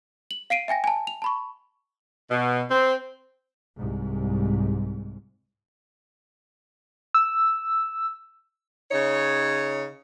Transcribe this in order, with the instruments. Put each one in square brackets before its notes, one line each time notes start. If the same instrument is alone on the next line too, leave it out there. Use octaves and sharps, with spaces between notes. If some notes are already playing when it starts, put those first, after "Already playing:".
[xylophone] F#7
F5 C7 D7 D#7
E5 G5 G#5 A#6
G#5 A5
F7
A5 B5 C#6
[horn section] B2
C4
[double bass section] C2 G#2
[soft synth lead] E6
[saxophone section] C#3 D#4 C#5